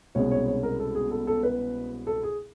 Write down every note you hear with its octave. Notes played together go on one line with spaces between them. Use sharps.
C2 B2 G#3 C#4 C#5
C#5
C#5
A#4
A4
G#4
A4
A4
B4
A4
G#4